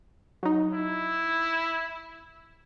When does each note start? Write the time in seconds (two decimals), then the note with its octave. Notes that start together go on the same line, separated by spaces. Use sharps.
0.43 F#3 D#4
0.73 E4